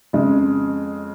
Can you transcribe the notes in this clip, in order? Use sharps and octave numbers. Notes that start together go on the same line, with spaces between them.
F2 C#3 G#3